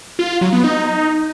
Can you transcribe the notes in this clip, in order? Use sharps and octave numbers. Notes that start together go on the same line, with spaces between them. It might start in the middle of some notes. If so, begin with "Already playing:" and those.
F4
F4
F#3
B3
D#4